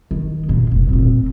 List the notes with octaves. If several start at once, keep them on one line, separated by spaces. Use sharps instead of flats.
D#3
A#2 G#3
F1
A#2 C4